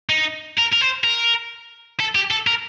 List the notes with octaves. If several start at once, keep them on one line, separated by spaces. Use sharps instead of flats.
D#4
A#4
A#4
C5
A#4
A4
G4
A4
A#4